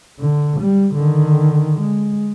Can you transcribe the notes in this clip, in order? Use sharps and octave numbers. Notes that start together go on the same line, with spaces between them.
D3
G3
D3 D#3
G#3